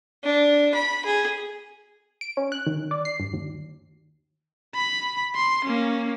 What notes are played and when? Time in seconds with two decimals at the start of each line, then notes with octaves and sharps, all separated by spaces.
0.24 D4
0.74 B5
1.05 G#4
2.21 D7
2.37 C#4
2.52 F#6
2.67 D#3
2.91 D5
3.05 C7
3.20 G2
3.33 D#2
4.75 B5
5.35 C6
5.65 A#3 C#4